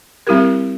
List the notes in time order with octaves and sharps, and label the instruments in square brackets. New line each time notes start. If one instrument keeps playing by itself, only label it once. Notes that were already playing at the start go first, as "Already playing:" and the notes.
[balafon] G3 C4 E4 G4 A#4